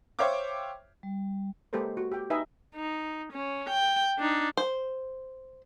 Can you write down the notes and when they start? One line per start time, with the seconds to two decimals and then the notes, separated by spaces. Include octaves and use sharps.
0.19 C5 C#5 E5 F5 G5 D6
1.03 G3
1.73 G#3 A#3 G4 A4 B4 C5
1.97 F#4
2.12 G4 G5
2.30 D#4 B4 D#5 E5 G#5
2.75 D#4
3.33 C#4
3.70 G5
4.18 D4 D#4
4.57 C5